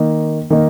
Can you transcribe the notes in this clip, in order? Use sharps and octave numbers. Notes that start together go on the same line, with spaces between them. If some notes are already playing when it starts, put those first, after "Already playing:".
Already playing: D#3 A#3 D#4
D#3 A#3 D#4